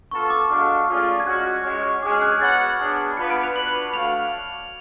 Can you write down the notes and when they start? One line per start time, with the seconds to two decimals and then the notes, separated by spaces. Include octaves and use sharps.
0.11 B3 F4 A4 C#6
0.30 D6
0.49 G#3 D4 F#4 A4 F5 F6
0.88 A3 C#4 F4 G#4 D5
1.20 G#6
1.27 G#3 C#4 F#4 F#6
1.64 G#3 C#4 F#4 C#5
2.03 G#3 C#4 G#4 D6
2.12 F6
2.22 F#6
2.32 G#6
2.41 B3 F#4 C#5 F#5 A6
2.80 B3 D4 G#4
3.17 B3 D4 F4 B4 C#7
3.30 D7
3.43 F7
3.55 D4 F#4 B4 F#7
3.94 A3 D4 F#4 C#5 F5 F7